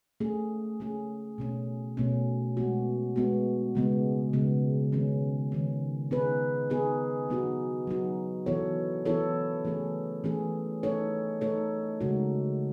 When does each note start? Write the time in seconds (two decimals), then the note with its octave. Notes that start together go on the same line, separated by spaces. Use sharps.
0.20 A3 C#4 G#4
0.80 A3 C#4 G#4
1.38 B2 A3 C#4
1.97 B2 A3 C#4
2.57 G#3 B3 F#4
3.16 G#3 B3 F#4
3.75 C#3 G#3 B3
4.33 C#3 G#3 B3
4.92 D#3 G#3 C#4
5.52 D#3 G#3 C#4
6.11 B3 D#4 G#4 B4
6.70 B3 D#4 G#4 B4
7.29 F#3 B3 D#4 F#4
7.87 F#3 B3 D#4 F#4
8.46 E3 B3 E4 A4 C#5
9.05 E3 B3 E4 A4 C#5
9.65 E3 A3 C#4 G#4
10.24 E3 A3 C#4 G#4
10.83 A3 D#4 A4 C#5
11.41 A3 D#4 A4 C#5
12.01 C#3 G#3 D#4 F#4